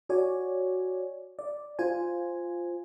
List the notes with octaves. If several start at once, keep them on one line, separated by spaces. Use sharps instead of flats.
F#4 C#5 D5 G#5
D5
F4 C5 G#5